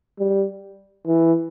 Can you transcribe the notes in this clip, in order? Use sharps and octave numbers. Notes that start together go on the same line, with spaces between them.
G3
E3